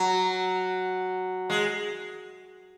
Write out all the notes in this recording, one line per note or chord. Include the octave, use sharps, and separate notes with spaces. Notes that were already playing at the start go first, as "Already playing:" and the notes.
Already playing: F#3
G#3